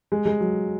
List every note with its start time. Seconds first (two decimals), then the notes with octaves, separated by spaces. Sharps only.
0.12 G#3
0.26 G#3
0.40 F#3